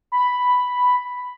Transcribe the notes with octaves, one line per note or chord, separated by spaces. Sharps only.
B5